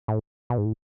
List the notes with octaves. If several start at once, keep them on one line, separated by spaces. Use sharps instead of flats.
A2
B2
G#2
A2